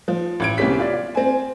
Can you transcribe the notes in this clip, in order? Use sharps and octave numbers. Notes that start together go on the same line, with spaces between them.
F3
A1 G#6 D7
C2 B3 C#4 G4 B6
F4 D5
F4
C4 G#5